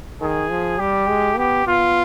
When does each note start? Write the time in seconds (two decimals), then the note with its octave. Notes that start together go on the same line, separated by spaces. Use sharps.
0.21 D#3 G#4
0.50 F3
0.79 G3 G4
1.09 G#3
1.37 B3 G4
1.67 B3 F4